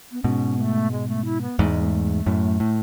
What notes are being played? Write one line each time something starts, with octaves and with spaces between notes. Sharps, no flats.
B3
G#2 B2 C#4
B3
A3
G#3
A3
E4
B3
E2 G#2 A3
G#3
B3
A3
F#2 A2
A2